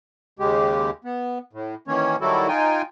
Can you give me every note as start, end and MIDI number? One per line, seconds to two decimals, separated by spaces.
0.39 0.90 39
0.39 0.90 49
0.39 0.90 56
0.39 0.90 67
1.04 1.38 59
1.53 1.75 45
1.88 2.16 51
1.88 2.16 52
1.88 2.16 58
1.88 2.16 61
1.88 2.16 73
2.21 2.48 51
2.21 2.48 54
2.21 2.48 55
2.21 2.48 64
2.21 2.48 66
2.21 2.48 69
2.48 2.82 63
2.48 2.82 65
2.48 2.82 79
2.48 2.82 80